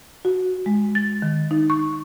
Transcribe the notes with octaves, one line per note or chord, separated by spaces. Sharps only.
F#4
G#3
A6
D#3
D#4
C#6